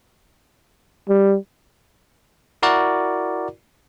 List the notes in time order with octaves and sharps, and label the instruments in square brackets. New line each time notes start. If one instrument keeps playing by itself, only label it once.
[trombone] G3
[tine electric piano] E4 F#4 A#4 D5